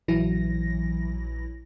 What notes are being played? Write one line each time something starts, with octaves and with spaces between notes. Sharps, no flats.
A#1 E3 F#3 E4 A#6